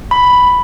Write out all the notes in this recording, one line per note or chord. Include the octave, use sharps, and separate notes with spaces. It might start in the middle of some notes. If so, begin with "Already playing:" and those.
B5